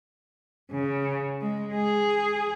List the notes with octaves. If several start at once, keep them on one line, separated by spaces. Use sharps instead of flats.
C#3
G#3
G#4